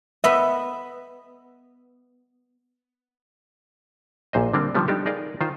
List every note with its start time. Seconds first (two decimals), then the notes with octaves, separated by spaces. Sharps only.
0.24 B3 D#5 E5
4.33 A#1 A#2 C5 D#5
4.54 D3 G3 A#3 C4 D4
4.75 D3 D#3 F3 G3 B3
4.88 G3 D4 D#4 G4 A4
5.06 D#4 G#4 A#4 D5 D#5 F5
5.41 D#3 F4 C5